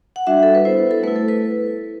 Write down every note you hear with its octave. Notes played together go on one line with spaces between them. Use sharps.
F#5
G3 D4 F#4 E5
A4
B4
B3 E4 C5
A4
A3 E4 B4
A4
B4